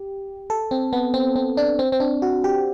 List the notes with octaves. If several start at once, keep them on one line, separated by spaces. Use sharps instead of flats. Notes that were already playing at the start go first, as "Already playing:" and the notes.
Already playing: G4
A4
C4
B3
C4
C4
D4
C4
C4
D4
F#4
G4